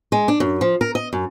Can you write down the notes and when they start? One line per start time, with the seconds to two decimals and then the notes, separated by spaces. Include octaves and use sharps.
0.12 G#3
0.28 D4
0.40 F#2
0.61 F3
0.81 A#4
0.95 D#5
1.13 F#2